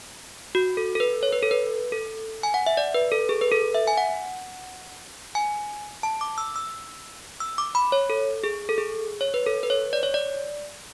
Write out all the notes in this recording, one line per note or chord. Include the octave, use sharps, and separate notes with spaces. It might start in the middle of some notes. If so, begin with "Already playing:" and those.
F#4
A4
A4
B4
C#5
B4
A4
B4
A4
G#5
F#5
E5
D5
B4
A4
G#4
B4
A4
E5
G#5
F#5
G#5
A5
D6
E6
E6
E6
D6
B5
C#5
A4
G#4
A4
G#4
C#5
B4
A4
B4
C#5
D5
C#5
D5